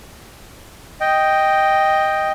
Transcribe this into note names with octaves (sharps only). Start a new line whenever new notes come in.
D#5 G5